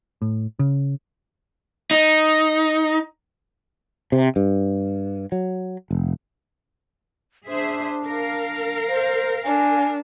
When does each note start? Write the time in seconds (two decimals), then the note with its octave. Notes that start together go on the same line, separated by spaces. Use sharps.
0.22 A2
0.59 C#3
1.91 D#4
4.12 C3
4.36 G2
5.32 F#3
5.91 F1
7.47 D4 G#4 C5 E5
8.06 A#4 F5
8.88 C5
9.44 D4 G#5